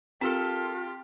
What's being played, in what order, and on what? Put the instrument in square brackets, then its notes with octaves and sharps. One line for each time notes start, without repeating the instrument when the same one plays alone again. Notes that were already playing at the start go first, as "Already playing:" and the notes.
[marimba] C4 [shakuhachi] F4 [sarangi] G4 [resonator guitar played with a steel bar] A4 A#4 A5